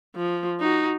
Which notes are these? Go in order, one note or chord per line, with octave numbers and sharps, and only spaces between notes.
F3
D#4 F#4